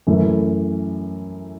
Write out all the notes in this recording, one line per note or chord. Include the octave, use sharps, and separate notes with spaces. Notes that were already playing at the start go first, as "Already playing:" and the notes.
F#2 E3 A3